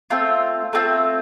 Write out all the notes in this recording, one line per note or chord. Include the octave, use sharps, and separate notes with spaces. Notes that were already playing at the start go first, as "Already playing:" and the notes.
A3 C4 F4
A3 C4 F4